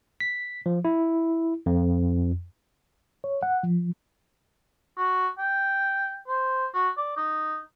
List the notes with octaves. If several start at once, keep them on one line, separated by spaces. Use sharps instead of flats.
B6
F3
E4
F2
C#5
F#5
F3
F#4
G5
C5
F#4
D5
D#4